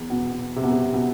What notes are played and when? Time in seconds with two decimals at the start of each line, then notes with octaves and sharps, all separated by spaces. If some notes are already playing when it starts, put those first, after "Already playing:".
Already playing: E2
0.10 B2
0.56 C3
0.63 B2
0.71 C3
0.94 B2